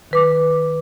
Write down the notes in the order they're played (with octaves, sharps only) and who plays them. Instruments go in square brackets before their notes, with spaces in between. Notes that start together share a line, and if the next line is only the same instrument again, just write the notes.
[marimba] D#3 B4 D6